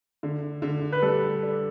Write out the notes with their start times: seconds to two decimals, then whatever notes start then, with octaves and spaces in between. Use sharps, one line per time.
0.23 D3
0.62 D3
0.92 B4
1.02 G3 A4
1.43 D4